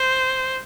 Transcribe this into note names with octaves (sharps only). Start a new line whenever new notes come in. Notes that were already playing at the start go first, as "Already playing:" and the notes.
Already playing: C5